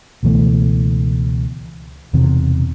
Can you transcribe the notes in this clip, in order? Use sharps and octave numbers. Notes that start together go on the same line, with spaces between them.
C#2 B2 E3 A3
E1 E2 C3 D#3